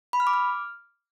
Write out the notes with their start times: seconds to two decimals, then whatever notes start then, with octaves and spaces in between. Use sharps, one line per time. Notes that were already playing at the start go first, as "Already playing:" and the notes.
0.13 B5
0.20 F6
0.27 D6
0.33 F6